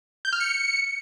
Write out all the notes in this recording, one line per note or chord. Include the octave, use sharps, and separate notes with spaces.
G6
F6
C#7